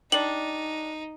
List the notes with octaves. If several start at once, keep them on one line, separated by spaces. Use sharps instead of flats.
G3 D4 D#4 F#7